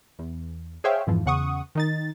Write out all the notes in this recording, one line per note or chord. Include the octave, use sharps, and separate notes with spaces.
E2
G#4 C5 C#5 E5 F5 G5
F2 G#2 E3 F3
E2 C#3 F#5 C#6 D#6
D#3 D#4 A6